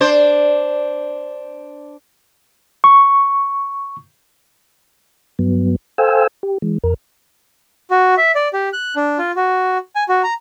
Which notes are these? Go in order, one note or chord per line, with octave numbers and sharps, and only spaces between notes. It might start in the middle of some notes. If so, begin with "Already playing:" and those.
D4 C5
C#6
G2 F#3 B3
A4 C5 F5 G5 G#5 E6
G4
E3 G#3
F2 A#4
F#4
E5
D5
G4
F#6
D4
F4
F#4
G#5
F#4
A#5